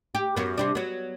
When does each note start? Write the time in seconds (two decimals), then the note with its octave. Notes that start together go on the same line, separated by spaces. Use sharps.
0.15 G4
0.37 F#2 B3
0.58 C3 G3 D4
0.75 F#3 B3